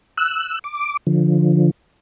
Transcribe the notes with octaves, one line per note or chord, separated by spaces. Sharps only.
E6 F#6
D6
D3 F3